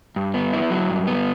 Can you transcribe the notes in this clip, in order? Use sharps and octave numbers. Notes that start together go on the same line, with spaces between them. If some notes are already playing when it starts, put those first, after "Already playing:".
G2
B3
E4
F#3
G2
B3